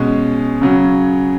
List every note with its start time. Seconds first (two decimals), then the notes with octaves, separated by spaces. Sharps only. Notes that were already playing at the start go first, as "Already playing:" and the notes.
Already playing: B2 G#3 C#4 G#4
0.62 C#3 F#3 C#4